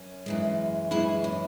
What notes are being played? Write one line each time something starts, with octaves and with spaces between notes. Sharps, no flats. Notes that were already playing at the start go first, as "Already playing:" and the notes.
Already playing: F#2 C#4
F#2 E3 G#3
F#2 E3 G#3 E4
C#4